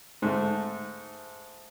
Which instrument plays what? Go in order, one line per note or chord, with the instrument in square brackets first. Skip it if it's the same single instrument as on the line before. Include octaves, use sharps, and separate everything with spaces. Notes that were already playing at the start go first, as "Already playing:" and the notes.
[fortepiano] G#2 A3